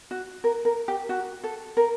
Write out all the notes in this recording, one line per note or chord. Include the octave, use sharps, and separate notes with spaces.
F#4
A#4
A#4
G4
F#4
A4
A#4